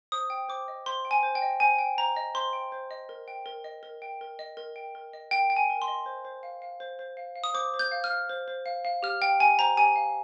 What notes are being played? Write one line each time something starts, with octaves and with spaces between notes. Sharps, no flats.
C5 D#6
G5
C5 D6
D#5
C5 C6
G5
G#5
C5
G5
D#5
C5 G#5
G5
C5 A#5
D#5
C5 C6
G5
C5
D#5
A#4
G5
A#4
D#5
A#4
G5
A#4
D#5
A#4
G5
A#4
D#5
A#4 G5
G5
G#5
A#4
C6
D#5
C5
C5
F5
F5
C5
C5
F5
F5
D#6
C5 D6
C5
G6
F5
F6
F5
C5
C5
F5
F5
G4 F6
F5 G5
G4 G#5
C5 A#5
G4 G#5
F5